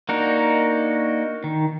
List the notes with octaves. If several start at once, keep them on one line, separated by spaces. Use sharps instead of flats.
A#3 D4 D#4 F#4 A#4
D#3